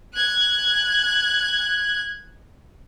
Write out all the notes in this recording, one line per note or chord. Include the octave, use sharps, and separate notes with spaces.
F#6 G#6